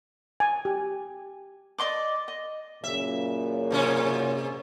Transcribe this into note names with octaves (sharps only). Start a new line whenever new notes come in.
G#5
G4
D5 D#5 C6 D6
D#5
F#2 A#2 C#3 E5
G#2 C3 C#4